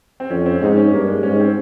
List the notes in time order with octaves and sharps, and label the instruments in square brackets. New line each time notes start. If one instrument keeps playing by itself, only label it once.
[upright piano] C4
[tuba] F2 [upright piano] C#4
[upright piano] C4
C#4
[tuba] G#2 [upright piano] D#4
[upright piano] C#4
[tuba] G2 [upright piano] A#3
[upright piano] G#3
[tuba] G#2 [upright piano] C#4
[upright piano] C4